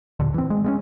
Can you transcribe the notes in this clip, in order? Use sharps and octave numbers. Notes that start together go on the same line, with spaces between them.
D#2 A#2 D3
E3 C4
G#3
G#3 A3 C#4